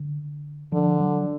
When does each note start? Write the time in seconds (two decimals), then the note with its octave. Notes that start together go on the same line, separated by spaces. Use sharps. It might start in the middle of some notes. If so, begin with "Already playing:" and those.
Already playing: D3
0.72 D3 F3
1.00 F#3